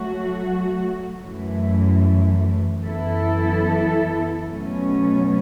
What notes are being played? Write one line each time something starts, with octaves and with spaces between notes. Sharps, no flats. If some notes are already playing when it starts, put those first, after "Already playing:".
Already playing: F#3 A3 F#4
F#2 E3 A3
F#2 E3 B3 E4 A4
B2 F#3 A3 C#4